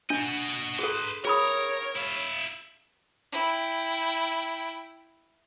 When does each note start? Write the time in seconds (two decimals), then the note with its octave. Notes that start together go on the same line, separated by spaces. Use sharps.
0.10 D4 F#4 D#5
0.79 G#4 A4 B4 C6
1.25 G#4 A#4 C#5 B5 D#6
1.96 E4 F5
3.32 E4 G5